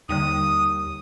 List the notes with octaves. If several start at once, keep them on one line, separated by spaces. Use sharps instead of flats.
D#2 D3 G3 D#4 D#6